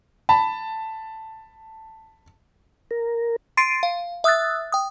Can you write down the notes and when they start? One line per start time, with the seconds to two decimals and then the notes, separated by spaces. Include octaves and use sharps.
0.29 A5 B5
2.91 A#4
3.57 C6 A6 C7 D7 D#7
3.83 F5
4.24 E5 D#6 E6 F#6 A6
4.72 G5 D#6